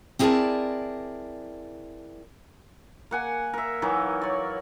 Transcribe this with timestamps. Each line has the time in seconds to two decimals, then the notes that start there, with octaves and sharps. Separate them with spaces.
0.19 C4 E4 G#4 A#4 D5 A5
3.11 A#3 F#5 G#5
3.54 A#4 E5
3.82 E3 F#3 A#3 D#4
4.21 C#5 D5